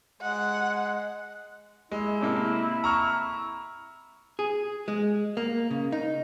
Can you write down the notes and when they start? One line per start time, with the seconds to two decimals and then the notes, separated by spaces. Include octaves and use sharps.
0.21 G#3 F#5
1.91 G#3 E4
2.21 A2 C3 A#3
2.84 A#5 C#6 F6
4.39 G#4
4.88 G#3
5.37 A#3
5.71 C#3
5.92 D#4